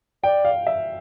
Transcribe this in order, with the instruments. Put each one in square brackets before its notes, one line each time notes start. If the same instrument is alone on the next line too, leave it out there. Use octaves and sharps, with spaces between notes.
[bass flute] D5 [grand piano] G5
[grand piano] F5
E5